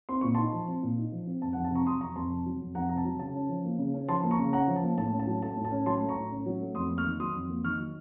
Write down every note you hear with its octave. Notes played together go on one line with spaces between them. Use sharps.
C4 C6
A#2 C#6
D#4 A5 C6
F3
C4
A#2
D#4
F3
C4
F2 A5
F#5
F2
A5
C3 A#5 C#6
F#3 C6 D#6
F2 A#5 C#6
F2 A5 C6
C3
F#3
F2
F2 F#5 A#5
C3 A#5
A5
F#3
C#3 A5
C#4
F3
A#3
C#3
C#4
F3 A5 C6
A#3
A#5 C#6
C#3
C#4 F#5 A#5
F3
A5
A#3
A2 A5
C#4
A5
F#3
A3 A5
A2
A5
C#4
F#3 A5 C6
A3
A#5 C#6
A2
C#4
F#3
A3
F2 C6 D#6
A#3
C#6 F6
D#3
F#3 C6 D#6
F2
A#3
D#3 C#6 F6
F#3